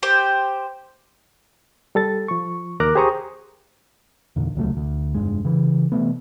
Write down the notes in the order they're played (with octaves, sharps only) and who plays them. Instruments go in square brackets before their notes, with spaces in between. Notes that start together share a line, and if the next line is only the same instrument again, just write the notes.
[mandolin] G4 C5
[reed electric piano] G3 A4 A6
F3 C#6
D#2 A#4 A#5 D6 F#6
G4 G#4 C5 A#5 C#6 D#6
[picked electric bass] E2 A#2 D3
D#1 C#2 F#3 A3
D2
F1 C2 G2 G#3
C#3 E3
C3 E3 A3 B3